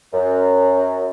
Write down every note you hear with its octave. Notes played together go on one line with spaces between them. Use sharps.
F#2